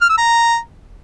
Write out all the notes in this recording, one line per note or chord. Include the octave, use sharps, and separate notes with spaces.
F6
E6
A#5